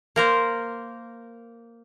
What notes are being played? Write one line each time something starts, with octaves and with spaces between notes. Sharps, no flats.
A#3 A#4 C5